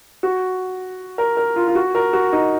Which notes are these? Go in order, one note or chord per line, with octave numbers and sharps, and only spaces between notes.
F#4
A#4
A#4
F4
F4
F#4
A#4
F#4
D#4